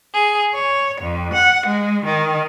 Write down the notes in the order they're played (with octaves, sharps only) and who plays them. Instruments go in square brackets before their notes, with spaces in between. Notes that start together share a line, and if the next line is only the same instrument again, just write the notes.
[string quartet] G#4
C#5
F2
F#5
G#3
D#3